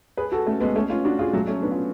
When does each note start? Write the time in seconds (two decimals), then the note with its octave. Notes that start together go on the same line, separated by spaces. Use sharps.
0.17 G#4 B4
0.32 F#4 A4
0.47 A3 C#4
0.60 G#3 B3
0.76 A3 C#4
0.90 C#4 F4
1.04 D4 F#4
1.19 F4 G#4
1.33 F#3 A3
1.47 A3 C#4
1.63 B3 D4
1.71 C#4 F4